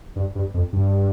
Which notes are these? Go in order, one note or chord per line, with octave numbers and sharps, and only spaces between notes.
G2
G2
F2
G2